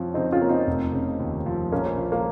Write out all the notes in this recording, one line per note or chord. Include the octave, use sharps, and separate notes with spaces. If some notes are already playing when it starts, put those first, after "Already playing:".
Already playing: F2 F3 C#4
C#3 C4 D#4
C#4 F4
A#3
C4 D#4
F1
C#3
D#2
F3
A#1 A#3 C#4
F3
A#3